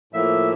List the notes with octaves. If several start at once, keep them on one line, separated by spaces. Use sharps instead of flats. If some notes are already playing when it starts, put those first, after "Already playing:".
A2 F3 A#3 E5